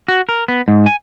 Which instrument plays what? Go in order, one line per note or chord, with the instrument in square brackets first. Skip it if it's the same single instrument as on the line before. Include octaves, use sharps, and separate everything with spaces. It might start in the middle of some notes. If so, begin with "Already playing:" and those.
[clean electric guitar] F#4
A#4
B3
G#2
G#5